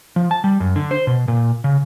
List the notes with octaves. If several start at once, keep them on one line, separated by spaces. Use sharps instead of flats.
F3
A5
G3
F#2
D3
C5
B2
A#2
C#3